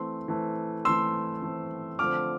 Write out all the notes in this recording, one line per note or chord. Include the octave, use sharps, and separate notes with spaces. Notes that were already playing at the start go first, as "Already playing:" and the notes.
Already playing: E3 A3 C4 C6
E3 A3 C4
E3 A3 C4 C6 E6
E3 A3 C4
D3 F3 A3 C4 D6 F6